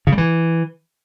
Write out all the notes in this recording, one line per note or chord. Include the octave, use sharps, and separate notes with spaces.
C#3
G3
E3